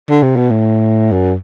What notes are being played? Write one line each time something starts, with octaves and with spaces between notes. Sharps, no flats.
D3
C3
B2
A2
F#2